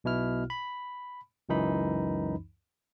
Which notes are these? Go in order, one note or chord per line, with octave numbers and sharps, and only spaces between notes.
B1 B2 E4 F6
B5
C#2 F#2 E3 D#4 B5